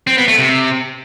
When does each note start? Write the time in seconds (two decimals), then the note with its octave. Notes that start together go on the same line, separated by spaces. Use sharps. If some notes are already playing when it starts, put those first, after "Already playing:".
0.07 C4
0.17 B3
0.28 A3
0.38 C3